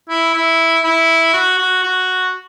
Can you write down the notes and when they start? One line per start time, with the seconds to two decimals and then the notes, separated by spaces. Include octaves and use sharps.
0.09 E4
0.34 E4
0.84 E4
1.33 F#4
1.58 F#4
1.83 F#4